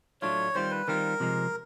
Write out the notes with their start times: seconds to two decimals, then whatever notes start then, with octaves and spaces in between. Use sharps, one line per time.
0.22 A2 F#3 A3 D4 F4 C#5
0.55 D#3 G3 C4 F4 C5
0.71 B4
0.88 D#3 G3 C4 F4 A#4
1.20 C3 F3 G#3